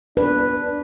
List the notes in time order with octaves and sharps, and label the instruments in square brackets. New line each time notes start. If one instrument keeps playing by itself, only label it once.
[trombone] D4 [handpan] B4